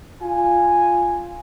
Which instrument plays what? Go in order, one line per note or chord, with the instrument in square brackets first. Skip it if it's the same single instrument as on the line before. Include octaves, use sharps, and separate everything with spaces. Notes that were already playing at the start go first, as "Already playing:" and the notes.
[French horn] F4 [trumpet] G#5